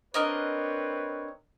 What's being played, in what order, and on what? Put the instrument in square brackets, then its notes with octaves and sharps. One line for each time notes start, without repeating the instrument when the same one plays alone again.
[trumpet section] C4 B4 C#5 [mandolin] D4 A#4 D#5